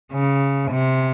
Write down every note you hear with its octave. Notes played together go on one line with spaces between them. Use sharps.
C#3
C3